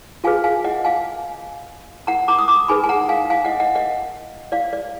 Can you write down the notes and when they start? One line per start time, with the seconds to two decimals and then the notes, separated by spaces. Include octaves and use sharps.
0.24 F4 G#4 B4 F5 G#5
0.44 F5 G#5
0.64 D#5 F#5
0.85 F5 G#5
2.07 F#5 A#5
2.28 A#5 D6
2.39 D#6
2.48 A#5 D6
2.68 D#4 G#4 B4 G#5 B5
2.84 G#5
2.89 F#5 A#5
3.09 F5 G#5
3.30 F5 G#5
3.45 D#5 F#5
3.60 D#5 F#5
3.75 D#5 F#5
4.52 D5 F5
4.73 D5